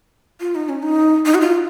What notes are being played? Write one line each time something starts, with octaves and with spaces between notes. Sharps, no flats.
F4
D#4
C#4
D#4
D#4
F#4
F4